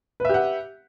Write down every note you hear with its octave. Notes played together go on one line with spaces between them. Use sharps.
G4 B4 E5 F#5